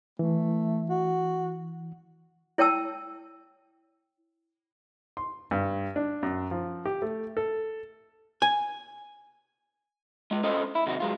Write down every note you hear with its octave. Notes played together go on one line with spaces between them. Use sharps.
E3 A3
F#4
E4 C#5 G5 A5 E6
C6
G2
D4
F#2
F3
G4
A3
A4
G#5
G#3 F4
C#4 F4 A4 C5 D#5
E4
C3 D#3 F#3 D#4 F#4
F#3 G#3 F4